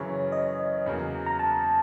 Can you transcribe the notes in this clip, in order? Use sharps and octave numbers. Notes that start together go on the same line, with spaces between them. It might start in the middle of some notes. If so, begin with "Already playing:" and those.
Already playing: F#2 C#3 E3 C#5
D#5
E2 C#3 F#3 A#3
A#5
A5